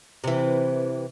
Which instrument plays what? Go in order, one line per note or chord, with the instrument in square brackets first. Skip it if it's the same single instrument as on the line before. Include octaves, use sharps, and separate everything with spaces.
[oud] C3 E3